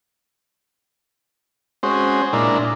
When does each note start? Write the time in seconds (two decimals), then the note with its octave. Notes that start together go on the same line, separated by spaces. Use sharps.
1.83 G#3 C4 C#4 F#4 G#4 C5
2.33 A#2 G#3 D4 E4 A#4